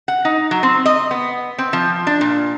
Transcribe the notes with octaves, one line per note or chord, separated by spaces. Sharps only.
F#5
D#4
F#3
C4
D#5
B3
C4
F3
D4
A#2